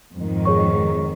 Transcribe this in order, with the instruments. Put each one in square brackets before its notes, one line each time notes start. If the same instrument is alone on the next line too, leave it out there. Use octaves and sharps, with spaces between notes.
[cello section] F2 G#2 D#3
[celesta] G#4 C#5 C#6